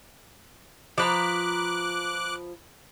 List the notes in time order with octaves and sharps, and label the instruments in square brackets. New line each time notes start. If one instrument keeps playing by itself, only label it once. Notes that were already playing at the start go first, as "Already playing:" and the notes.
[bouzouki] F3 B4 A#5 [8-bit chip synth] D6 F#6